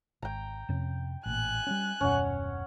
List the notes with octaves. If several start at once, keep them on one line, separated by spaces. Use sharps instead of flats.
G#1 G5 A#5
F2 C3 C#4
A1 A#2 G#5 F#6
G3 A#3 C#4
D#1 F#2 B2 C#4 F#5